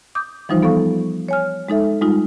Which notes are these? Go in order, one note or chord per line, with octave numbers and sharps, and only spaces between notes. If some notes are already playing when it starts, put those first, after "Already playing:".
D6 D#6 G6
E3 F3 G3 D#4 F4 C5
B3 A4 F5 C#6
C#5 G#5 F6
G#3 D#4 A4 E5
G3 G#3 D#4 F4